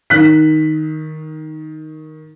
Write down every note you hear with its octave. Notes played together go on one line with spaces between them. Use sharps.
D#3 F#6 B6